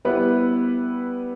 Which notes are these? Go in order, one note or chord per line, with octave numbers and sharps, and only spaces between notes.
G3 B3 E4 B4